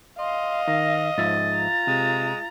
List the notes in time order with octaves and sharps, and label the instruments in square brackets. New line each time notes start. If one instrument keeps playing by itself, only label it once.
[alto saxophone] D#5 [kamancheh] F5 [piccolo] C6
[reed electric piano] D#3 [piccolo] A#6
[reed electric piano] G#2 F3 E5 [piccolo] A6
[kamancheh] F4 A#5
[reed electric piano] C3 [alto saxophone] G#3